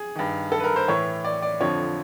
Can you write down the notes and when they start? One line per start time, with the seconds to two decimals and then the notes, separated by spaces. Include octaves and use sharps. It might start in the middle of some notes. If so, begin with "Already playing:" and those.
Already playing: G#4
0.15 G2 D#3
0.52 A4
0.60 B4
0.64 A#4
0.76 C5
0.88 A2 E3 C#5
1.24 D5
1.42 D5
1.60 F2 D3 F3 C#5